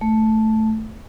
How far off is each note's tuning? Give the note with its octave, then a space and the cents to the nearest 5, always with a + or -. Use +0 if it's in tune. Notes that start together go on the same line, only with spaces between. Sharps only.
A3 -5